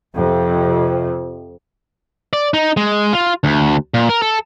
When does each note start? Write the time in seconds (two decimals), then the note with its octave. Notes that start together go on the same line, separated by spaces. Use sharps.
0.14 F2 C3
2.33 D5
2.54 D#4
2.77 G#3
3.13 F4
3.44 D2
3.94 A#2
4.09 A#4
4.22 A4